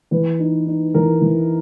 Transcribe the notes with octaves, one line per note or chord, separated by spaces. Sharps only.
E3 B4
D#4
D#4
E3 A#4
E3